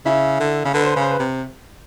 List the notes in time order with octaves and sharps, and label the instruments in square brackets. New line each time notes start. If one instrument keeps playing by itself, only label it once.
[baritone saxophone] C#3 [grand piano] E4 E5
[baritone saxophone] D3
C#3
[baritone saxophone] D3 [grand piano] B4
[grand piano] C5
[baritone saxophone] C#3 [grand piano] B4
[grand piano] C5
B4
[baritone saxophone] C3